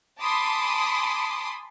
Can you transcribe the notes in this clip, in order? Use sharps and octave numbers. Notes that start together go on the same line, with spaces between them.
G#5 A5 B5 C6 D6 D#6